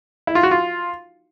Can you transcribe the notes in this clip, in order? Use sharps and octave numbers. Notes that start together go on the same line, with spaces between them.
E4
F4
F#4
F4